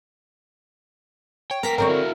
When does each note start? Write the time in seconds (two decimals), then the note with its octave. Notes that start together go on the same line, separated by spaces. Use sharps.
1.51 C#5 G5
1.63 A#3 B3 G5 A#5 B6
1.78 D3 C4 A#4 C#5
1.89 E4 F#4